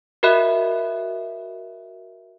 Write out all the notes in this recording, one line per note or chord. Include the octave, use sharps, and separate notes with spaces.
F#4 A#4 D#5 E5 B5 F#6